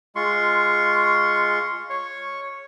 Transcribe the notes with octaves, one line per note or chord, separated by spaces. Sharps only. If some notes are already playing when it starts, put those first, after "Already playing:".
G#3 F4 C6 C#6
C#5 C#6